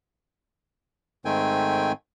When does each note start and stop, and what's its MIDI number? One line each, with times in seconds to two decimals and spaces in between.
1.25 1.92 44
1.25 1.92 51
1.25 1.92 57
1.25 1.92 60
1.25 1.92 79
1.25 1.92 80